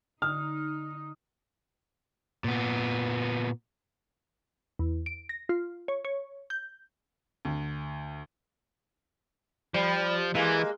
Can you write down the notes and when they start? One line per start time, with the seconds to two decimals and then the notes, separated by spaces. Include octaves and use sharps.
0.22 D3 D#4 D#6 F6
2.44 A#2 B3
4.79 E2
5.06 D7
5.29 A#6
5.49 F4
5.88 C#5
6.05 C#5
6.50 G6
7.45 D2
9.74 F3 G3
10.35 E3 G#3 A#3